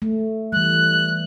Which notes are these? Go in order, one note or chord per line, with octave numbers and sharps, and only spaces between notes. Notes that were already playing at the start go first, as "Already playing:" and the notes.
A3
E3 G3 F#6